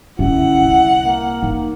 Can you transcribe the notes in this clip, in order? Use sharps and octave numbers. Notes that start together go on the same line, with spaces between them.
D3 C#4 E4 F#5
C2
A#3
D#4